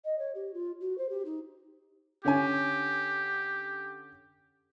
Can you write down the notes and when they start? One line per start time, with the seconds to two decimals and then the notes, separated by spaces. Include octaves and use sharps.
0.04 D#5
0.18 C#5
0.35 G4
0.53 F4
0.80 F#4
0.98 C5
1.09 G4
1.25 D#4
2.25 D3 C#4 G4 G#5